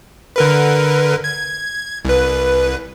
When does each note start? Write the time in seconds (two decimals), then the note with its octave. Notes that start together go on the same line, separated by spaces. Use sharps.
0.36 D3 A#4 B4
1.24 G#6
2.05 C2 B4